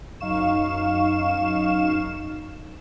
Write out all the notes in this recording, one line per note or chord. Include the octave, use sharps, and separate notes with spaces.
F#2 D#4 F5 C#6 E7